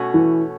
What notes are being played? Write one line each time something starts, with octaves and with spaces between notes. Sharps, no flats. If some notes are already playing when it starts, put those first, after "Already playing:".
Already playing: B2 A3 C#4 F#4
E3